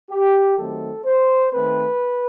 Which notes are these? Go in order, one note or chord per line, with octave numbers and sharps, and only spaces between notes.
G4
D#3 F#3 A3 C4 A4
C5
D#3 A3 C4 B4